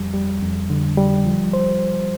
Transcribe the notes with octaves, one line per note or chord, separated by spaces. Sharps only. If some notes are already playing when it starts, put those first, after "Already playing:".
Already playing: F2 G3
G3
F2
D3
G3
F3
C5